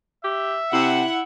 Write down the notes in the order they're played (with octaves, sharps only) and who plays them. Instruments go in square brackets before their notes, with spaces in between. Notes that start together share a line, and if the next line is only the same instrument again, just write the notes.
[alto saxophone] G4 [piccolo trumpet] E5
[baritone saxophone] C3 [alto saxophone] E4 [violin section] F#5